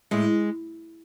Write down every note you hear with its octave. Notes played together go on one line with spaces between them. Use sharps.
A2 G#3